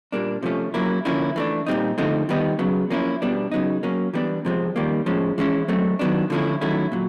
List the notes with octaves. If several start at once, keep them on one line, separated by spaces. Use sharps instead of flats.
A#2 G3 A#3 D4
C3 F3 A3 C#4
F#3 A#3 C#4 E4
D3 F3 A#3 C#4 E4
E3 A3 D4
A#2 G3 C4 D#4
D3 F3 A3 C4 D#4
D#3 G3 B3 D#4
C#3 F#3 B3
F3 A#3 C#4 E4
B2 G3 B3 D4
C#3 F#3 B3 D#4
F#3 A#3 C#4
E3 G3 B3 D4
C3 F3 G#3 C4
D#3 G3 A#3
A2 F3 G#3 C#4
E3 G#3 C#4 E4
F#3 A3 C4
D#3 F#3 B3 D4
D3 F3 A3 C#4 E4
D#3 F#3 A3 C#4 E4
A#2 F#3